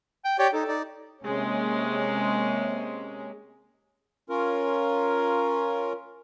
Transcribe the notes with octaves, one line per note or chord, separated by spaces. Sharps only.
G5
G4 C#5 D5 G5
D#4 A4
D#4 D5
C3 G#3 A#3 C#4
C#4 F4 A#4